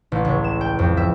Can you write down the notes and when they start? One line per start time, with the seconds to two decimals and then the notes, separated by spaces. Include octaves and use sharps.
0.12 A1
0.25 C#2
0.44 E7
0.61 G5
0.79 F2
0.97 E5